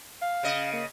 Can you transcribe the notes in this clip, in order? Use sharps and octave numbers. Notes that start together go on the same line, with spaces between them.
F5
C#3 D#5
A#3